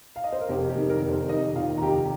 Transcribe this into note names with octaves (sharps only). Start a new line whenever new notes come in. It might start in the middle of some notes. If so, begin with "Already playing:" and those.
F5
D#5
C5
A#4
F1 G4
G4
D#3
A#4
F1
C4 C5
D#3 D#4 D#5
D#2 F4 F5
A#5
F1 G4 G5